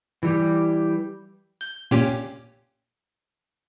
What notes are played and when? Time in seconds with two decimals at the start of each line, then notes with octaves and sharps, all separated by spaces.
0.23 E3 G3 G4
1.61 G6
1.91 A#2 C#4 G4